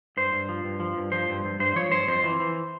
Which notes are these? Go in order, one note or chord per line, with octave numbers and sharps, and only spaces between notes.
G2 C5
G2
F3
G2
F3
G2
F3 C5
G2
G2
G2 C5
F3 C#5
G2 C5
F2 C5
E3
E3